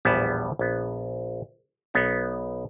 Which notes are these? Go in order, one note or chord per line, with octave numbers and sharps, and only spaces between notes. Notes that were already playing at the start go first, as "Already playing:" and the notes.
A#1 E2 A2 G3 B3 A5
A#1 B3
B1 B3 D#4